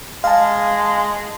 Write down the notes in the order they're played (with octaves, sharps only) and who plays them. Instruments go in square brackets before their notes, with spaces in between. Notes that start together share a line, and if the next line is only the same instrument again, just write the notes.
[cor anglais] G#3 [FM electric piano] F5 A5